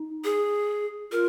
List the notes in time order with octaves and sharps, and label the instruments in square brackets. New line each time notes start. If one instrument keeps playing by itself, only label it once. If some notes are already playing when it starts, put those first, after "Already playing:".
Already playing: [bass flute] D#4
[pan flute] G#4
[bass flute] F4 [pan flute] A#4